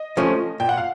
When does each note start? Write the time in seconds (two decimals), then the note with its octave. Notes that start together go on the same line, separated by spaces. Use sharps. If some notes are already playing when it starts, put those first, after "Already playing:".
Already playing: D#5
0.17 F3 A3 C#4
0.60 A#2 G5
0.69 F#5
0.77 F5